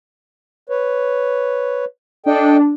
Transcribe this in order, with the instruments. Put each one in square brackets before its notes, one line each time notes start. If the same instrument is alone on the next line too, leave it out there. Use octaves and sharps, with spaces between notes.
[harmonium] B4 C#5
[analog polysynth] D4 [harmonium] A4 D#5 G5